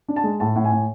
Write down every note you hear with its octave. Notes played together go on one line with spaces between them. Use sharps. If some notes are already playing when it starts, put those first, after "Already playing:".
D4
A5
G#3
A2 A5
A2
G#5
A2